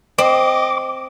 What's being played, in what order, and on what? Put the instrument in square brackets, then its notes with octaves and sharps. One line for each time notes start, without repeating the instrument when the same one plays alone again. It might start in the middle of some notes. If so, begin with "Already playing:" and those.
[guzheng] C4 [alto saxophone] D#5 [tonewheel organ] D6